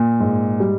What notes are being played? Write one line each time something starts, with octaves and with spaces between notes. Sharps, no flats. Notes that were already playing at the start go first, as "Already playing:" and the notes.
Already playing: A#2
G#2
G3